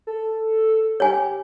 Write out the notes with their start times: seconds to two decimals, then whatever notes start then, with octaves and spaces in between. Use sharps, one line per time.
0.07 A4
1.00 G4 C#5 G#5